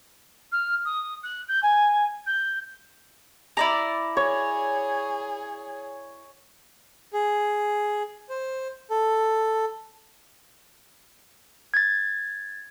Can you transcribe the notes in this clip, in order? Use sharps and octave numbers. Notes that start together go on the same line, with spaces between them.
F6
D#6
F#6
G6
G#5
G6
E4 D5 A#5
G#4 C#5
G#4
C5
A4
G#6 A6